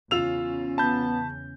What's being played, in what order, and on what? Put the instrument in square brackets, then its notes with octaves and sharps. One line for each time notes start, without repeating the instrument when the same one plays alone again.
[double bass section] E2 C#3 C#4 [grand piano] F4 E6 F7
[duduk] B3 [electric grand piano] A5 B5 G6